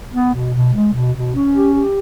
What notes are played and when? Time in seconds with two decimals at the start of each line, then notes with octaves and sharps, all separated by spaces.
0.12 B3
0.33 B2
0.54 B2
0.74 G#3
0.94 B2
1.14 B2
1.35 C#4
1.56 G4
1.75 G4